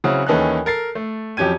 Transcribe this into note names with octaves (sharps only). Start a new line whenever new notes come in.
C#3 F#3 C4 C#4 E4 F#4
D#2 E3 C#4 D#4 A4 F#6
A4 A#4 A6 C7
A3
F2 F#3 C#4 G4 G#6 D#7